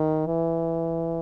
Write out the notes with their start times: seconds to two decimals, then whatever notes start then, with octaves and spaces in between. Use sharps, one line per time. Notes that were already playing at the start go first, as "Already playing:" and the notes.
Already playing: D#3
0.26 E3